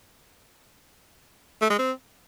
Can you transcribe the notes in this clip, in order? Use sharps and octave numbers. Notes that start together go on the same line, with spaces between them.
A3
G#3
C4